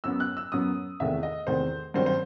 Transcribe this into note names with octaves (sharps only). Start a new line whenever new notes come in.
F#2 F#3 B3 E6
F#6
E6
F#2 F#3 B3 D#6
E2 C3 D#3 A3 E5
D#5
E2 C3 D#3 A3 C5
G2 D#3 F#3 C4 C5
C5